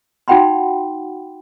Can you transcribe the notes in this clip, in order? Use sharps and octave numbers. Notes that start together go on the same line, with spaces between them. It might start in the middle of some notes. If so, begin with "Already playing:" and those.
D#4 F#4 F#5 G5 B5 C6